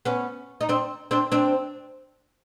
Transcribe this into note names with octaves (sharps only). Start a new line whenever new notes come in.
B3 C#4
D#4
C4 D4
C4 D4
C4 D4